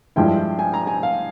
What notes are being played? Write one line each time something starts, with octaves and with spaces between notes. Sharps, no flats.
G2 F3 G#3 E4 G5
G#5
A#5
G#5
F5